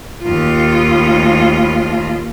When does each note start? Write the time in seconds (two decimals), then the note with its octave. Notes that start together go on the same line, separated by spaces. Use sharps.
0.23 D#2 F4